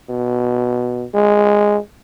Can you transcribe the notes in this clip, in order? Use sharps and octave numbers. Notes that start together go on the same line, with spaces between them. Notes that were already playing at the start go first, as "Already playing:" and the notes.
B2
G#3